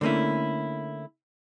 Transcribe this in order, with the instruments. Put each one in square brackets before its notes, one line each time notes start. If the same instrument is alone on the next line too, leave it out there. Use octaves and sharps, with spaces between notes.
[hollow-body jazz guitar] D3 A3 A#3 C#4 E4